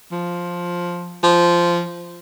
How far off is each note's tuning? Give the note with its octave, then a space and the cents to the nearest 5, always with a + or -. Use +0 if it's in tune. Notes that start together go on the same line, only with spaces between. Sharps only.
F3 +5
F3 -10